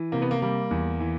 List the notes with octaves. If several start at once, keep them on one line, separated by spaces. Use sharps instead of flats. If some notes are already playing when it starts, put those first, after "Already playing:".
Already playing: E3
C3 A#3
B3
A#3
G3 A#3
E2
E3